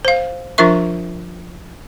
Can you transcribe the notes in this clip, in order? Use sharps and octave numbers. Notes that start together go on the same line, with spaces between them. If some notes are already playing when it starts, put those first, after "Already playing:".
C5 F5
F3 D4 F4 A#4 E5 C#6